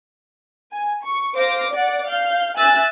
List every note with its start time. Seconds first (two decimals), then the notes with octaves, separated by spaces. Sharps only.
0.73 G#5
1.04 C#6
1.36 C5 F5 D6 A#6
1.73 D5 F#5
2.07 F5 G6
2.57 E5 G#5 E6 F#6 A6